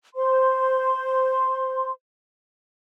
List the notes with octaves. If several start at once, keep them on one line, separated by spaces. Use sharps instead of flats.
C5 C6